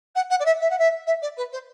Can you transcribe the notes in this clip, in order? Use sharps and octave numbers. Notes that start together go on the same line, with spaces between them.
F#5
F#5
D5
E5
E5
F#5
E5
E5
D5
B4
C5